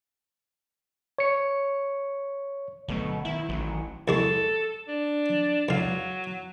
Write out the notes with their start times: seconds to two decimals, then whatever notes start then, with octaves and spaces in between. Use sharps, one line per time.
1.19 C#5 C#7
2.88 G1 B2 F#3 A3
3.25 D#3 E4
3.49 A1 D#3 E3 F#3
4.08 C2 G#3 A4 C#6
4.88 D4
5.69 C#2 F#3 F5